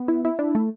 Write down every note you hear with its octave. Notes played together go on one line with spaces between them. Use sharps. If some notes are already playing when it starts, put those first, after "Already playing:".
Already playing: B3
E4
E4
D4
A3